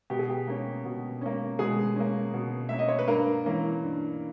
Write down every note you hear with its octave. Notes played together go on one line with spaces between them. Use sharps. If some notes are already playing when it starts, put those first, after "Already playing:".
B2 G4
G#4
G4
A#3 C#4
B2
A#3 C#4
B2 G#3 G#4
A#3 C#4
B2
A#3 C#4 E5
D#5
C#5
B4
G2 A#3 A#4
E3 A#3 C#4
G2